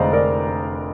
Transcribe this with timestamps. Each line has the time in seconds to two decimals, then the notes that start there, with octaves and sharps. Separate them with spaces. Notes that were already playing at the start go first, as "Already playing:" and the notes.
Already playing: F1 D3 G#3 C5 D5 D#5 F5 A#5
0.13 A#4 D5